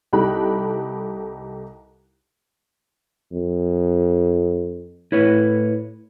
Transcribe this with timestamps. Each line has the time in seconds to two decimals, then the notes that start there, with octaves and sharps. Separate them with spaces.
0.13 C2 D#4 G4 A4 B5 F#6
3.32 F2
5.12 A2 E4 B4 C#5